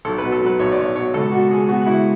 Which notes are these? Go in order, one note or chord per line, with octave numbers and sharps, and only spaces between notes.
B1 A4
B2 B4
A4
F#3
B4
B1 C#5
D5
B1 C#5
B2 C#5
C#2 A4
B2 F#4
G#3 G#4
G#4
B3 F#4
F#4
C#2 E4